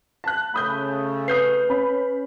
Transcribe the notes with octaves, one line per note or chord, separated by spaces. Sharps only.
A5 F#6
C#3 A3 B5 D#6 G6
B4 D#6 G6 C7
C#4 B5